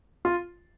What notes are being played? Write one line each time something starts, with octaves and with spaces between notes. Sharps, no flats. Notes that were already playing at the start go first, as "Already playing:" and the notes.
F4